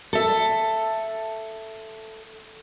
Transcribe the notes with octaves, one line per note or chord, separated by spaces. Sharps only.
A4 E5